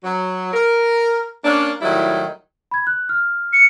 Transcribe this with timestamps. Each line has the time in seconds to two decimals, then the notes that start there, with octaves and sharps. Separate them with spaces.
0.04 F#3
0.53 A#4
1.44 A#3 C#4 D4
1.82 A2 D#3 F#3 G3 E4
2.71 B5 G#6
2.87 F#6
3.09 F6
3.53 C#7